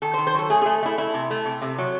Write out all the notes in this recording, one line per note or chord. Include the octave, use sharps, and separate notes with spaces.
D#3 A4
C5
D#3
C5
F#3 A4
A3 G#4
A3 G#4
A3 E4
A3 E4
C3
A3
C3
C3
F#3